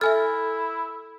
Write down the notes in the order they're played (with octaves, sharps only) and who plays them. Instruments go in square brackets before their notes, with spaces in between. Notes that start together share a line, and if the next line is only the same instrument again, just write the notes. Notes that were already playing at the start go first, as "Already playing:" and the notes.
[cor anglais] E4 [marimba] A4 [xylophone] E5 G#5 F6